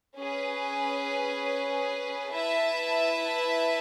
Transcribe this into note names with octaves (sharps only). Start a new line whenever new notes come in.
C#4 G#4 B4
E4 B4 E5 A5